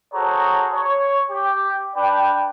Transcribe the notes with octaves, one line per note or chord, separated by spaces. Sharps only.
F#4 G#4 A4 C5 C#5 A#5
C#5
G4
D4 B4 D5 G5